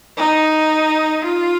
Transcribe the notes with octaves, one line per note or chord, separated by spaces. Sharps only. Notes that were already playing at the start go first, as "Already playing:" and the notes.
D#4
F4